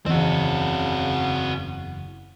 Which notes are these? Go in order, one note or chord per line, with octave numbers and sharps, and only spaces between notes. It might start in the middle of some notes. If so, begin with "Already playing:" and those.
F#1 E2 C#3 E3 C4 F#4